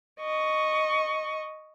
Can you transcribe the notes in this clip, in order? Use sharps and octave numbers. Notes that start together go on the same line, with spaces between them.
D#5 C#6